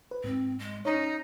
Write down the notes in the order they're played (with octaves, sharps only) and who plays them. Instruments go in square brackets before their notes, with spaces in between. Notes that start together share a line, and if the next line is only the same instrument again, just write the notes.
[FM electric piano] B4
[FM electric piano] G#2 [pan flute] C4
[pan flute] G#3
[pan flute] C#4 [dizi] D#4 [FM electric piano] C#5